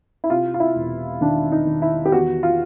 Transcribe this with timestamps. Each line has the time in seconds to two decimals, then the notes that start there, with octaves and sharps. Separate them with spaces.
0.24 E4
0.30 C3 F4
0.54 F4
0.60 E4
0.75 E1
1.21 D#3 D4
1.52 D#4
1.67 D#3
1.82 E4
2.06 G4
2.12 E2 F#4
2.43 F4